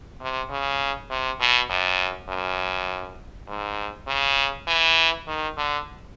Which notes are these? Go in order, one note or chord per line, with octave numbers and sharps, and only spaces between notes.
C3
C#3
C3
B2
F#2
F#2
G#2
C#3
E3
D#3
D3